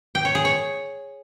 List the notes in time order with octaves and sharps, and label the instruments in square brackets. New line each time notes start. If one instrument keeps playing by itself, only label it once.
[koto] G5
C#5
G#4
C#5